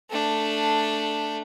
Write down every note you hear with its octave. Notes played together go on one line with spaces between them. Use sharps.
A3 D4